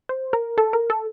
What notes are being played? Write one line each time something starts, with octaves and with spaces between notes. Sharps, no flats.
C5
A#4
A4
A#4
A4